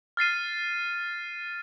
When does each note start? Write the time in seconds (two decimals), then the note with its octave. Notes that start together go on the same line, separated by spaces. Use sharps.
0.17 F6 A6 C7 D#7